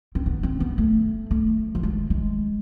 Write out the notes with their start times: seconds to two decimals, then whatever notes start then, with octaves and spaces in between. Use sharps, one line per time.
0.15 C4
0.26 B3
0.43 C4
0.60 B3
0.78 A3
1.31 A3
1.75 F3
1.83 G#3
2.10 G#3